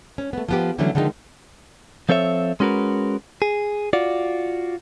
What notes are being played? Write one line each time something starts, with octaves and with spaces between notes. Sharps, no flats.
C#4
A3 B3
F3 B3 G4
D3 E3 F#3 G3 A3 C#4
D3 D#3 F3 G#3 D4 D#4
F3 C4 A4 C#5 E5
G#3 C#4 F#4 A#4 B4
G#4
F4 F#4 D5